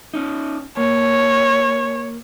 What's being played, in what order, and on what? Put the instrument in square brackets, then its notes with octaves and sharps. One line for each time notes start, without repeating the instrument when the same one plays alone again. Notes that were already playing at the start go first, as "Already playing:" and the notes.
[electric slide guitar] C#4 D#4
[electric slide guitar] A#3 [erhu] C#5